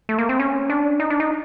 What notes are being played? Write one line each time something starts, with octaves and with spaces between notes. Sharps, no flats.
A3
A#3
C4
C#4
D4
D#4
D4
D#4